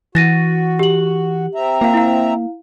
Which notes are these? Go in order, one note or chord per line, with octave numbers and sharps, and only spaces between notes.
E3 F#4 A6 A#6 D#7
G4 F#7
C4 E5 A#5
A#3 F4 F5
E4 F5